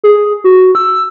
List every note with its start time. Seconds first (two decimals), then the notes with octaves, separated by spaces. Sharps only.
0.04 G#4
0.44 F#4
0.75 E6